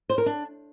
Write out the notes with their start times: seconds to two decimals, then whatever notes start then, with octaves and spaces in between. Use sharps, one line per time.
0.09 C5
0.18 A#4
0.26 D4